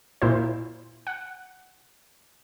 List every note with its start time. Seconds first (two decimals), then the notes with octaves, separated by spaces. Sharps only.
0.22 A#2 E4 C5
1.07 F#5